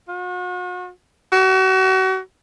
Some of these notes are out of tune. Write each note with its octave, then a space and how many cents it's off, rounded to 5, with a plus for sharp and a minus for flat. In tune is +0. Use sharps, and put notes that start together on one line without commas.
F#4 -40
F#4 +35